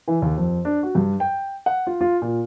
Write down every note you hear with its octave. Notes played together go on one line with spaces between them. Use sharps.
E3
D#2
F2
D4
F#4
G2
G5
F#5
F4
F4
A#2